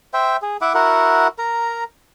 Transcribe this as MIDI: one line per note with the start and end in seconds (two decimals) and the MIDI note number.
0.14 0.37 72
0.14 0.37 76
0.14 0.37 79
0.42 0.57 68
0.61 0.73 64
0.61 0.73 76
0.61 0.73 78
0.61 0.73 86
0.74 1.27 64
0.74 1.27 66
0.74 1.27 70
0.74 1.27 78
1.38 1.84 70
1.38 1.84 82